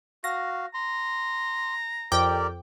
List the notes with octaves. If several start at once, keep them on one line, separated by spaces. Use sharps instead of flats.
F#4 F5 A#6
A#5 C6
F2 G4 A#4 D5 G5 D6